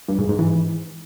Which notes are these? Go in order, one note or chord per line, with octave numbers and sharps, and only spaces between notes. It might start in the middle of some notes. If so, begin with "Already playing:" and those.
G2
G#2
G#2
E3